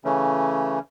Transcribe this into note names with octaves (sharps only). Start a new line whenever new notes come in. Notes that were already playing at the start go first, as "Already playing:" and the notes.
C#3 E3 A3 C#4